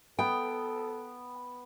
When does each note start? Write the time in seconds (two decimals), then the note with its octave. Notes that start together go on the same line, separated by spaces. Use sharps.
0.19 B3 A4 G5